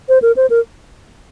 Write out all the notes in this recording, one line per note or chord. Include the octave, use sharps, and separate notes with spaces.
C5
A#4
C5
A#4